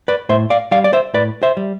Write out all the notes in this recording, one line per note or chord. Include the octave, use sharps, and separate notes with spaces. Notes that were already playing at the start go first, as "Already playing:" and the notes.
B4 D5
A2 C5 E5
D5 F5
G3 D5 F5
D5
C5 E5
A2 B4 D5
C5 E5
G3